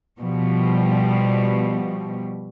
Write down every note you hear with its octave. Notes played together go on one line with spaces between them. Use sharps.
B2 F3 G3